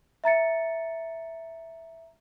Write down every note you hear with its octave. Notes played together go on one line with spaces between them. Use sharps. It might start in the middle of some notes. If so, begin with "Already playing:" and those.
E5 A#5 A6 C#7